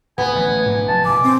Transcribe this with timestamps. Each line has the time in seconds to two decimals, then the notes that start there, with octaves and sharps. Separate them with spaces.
0.18 D1 B3 G#5
0.35 A1
0.66 G#2 F#3 D4
0.88 F1 A5
1.05 E1 G#5 D6
1.24 C4